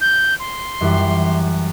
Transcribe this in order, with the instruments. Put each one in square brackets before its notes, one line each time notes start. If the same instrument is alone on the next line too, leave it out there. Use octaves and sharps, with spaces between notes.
[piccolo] G6
C6
[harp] F#2 E3 G3